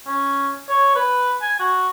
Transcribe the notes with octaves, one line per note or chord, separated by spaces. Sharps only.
C#4
C#5
B4
G#5
F#4